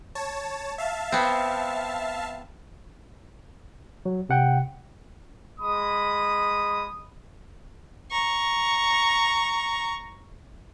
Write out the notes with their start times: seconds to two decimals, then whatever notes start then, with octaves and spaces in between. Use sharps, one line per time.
0.15 C#5 A5
0.78 E5 F5 A5
1.12 B3 C4
4.05 F#3
4.29 C3 F#5 G5
5.61 G#3 B5 D#6
8.11 A#5 C#6